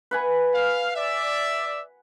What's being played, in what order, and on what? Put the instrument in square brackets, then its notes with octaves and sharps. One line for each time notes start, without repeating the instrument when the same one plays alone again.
[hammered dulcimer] B4 F#5 G#5
[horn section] F5
D5 E5